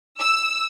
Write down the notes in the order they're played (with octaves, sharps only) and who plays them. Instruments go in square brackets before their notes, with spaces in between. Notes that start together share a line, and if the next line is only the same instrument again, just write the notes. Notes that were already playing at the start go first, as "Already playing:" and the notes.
[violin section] E6